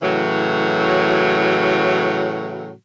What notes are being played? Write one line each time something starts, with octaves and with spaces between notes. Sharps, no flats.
A2 C#3 E3 F#3